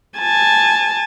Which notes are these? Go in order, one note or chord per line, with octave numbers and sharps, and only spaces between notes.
G#5 A5